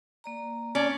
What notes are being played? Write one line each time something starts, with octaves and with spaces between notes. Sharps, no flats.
A#3 D5 A#5
C#4 D5